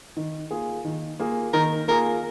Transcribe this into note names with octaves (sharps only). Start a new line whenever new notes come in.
D#3
A#3 F4 G#4
D#3
A#3 F4 G#4
D#3 A#4
A#3 F4 G#4 A#4